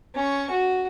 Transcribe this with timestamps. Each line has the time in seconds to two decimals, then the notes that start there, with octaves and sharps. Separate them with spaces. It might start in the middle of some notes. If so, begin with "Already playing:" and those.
0.15 C#4 C#6
0.50 F#4